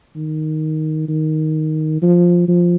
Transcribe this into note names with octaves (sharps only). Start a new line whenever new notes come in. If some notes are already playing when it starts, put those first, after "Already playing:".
D#3
D#3
F3
F3